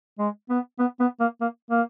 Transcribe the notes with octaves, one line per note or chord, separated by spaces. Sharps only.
G#3
B3
B3
B3
A#3
A#3
A#3